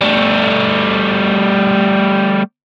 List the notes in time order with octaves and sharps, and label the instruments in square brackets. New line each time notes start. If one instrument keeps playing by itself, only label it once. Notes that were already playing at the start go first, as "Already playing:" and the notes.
[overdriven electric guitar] G3 A3